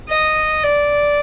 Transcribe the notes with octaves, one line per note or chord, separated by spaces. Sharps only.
D#5
D5